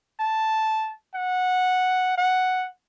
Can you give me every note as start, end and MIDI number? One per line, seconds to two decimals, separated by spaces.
0.20 0.92 81
1.15 2.14 78
2.18 2.67 78